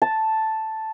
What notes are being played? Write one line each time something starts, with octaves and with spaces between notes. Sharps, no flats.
A5